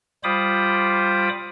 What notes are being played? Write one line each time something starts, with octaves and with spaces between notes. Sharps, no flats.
G3 F4 C5 B5 D6 D#6